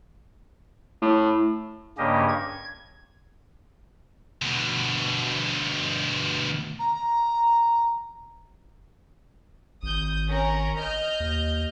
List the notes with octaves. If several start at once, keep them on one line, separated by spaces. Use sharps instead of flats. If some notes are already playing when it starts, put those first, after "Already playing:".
A2
G2 C#3 A#3 C#4 G4 D#5
G#6
D2 B2
A#5
G#1 D#6 G6
C#4 A#4 A#5
D#5 F6 G6
D#2